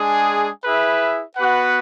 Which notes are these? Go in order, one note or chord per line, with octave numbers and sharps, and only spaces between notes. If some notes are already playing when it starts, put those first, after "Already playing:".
Already playing: G#3 D4 G#4
E4 G#4 B4 E5
B3 F#4 B4 F#5